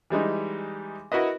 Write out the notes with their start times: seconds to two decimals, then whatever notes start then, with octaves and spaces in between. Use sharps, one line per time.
0.10 E3 G3 G#3 D#4
1.12 E4 F#4 A#4 B4 D#5